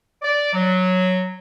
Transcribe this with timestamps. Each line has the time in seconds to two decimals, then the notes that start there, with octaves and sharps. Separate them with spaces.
0.22 D5
0.54 F#3